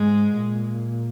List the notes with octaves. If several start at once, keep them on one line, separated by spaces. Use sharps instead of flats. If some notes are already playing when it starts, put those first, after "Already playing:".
Already playing: G#2 G#3
A#2